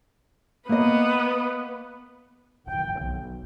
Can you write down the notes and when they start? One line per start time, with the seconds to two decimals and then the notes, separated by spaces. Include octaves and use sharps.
0.69 A#3 B3 B4 D#5
2.68 G5
3.02 B1